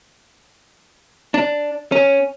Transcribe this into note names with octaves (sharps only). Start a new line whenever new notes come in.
D4
C#4